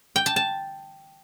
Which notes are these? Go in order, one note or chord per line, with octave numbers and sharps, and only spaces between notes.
G5
A5
A5